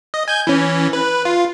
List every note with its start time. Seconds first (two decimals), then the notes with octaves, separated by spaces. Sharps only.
0.14 D#5
0.28 G#5 G6 G#6
0.47 E3 C#4
0.93 B4
1.25 F4